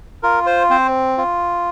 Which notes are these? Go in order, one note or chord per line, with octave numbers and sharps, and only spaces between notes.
F4 A#4
C5
C4 C5
F4